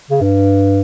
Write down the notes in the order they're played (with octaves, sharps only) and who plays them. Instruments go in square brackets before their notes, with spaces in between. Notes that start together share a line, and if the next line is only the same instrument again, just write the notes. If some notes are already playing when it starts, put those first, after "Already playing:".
[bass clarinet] C#3
G2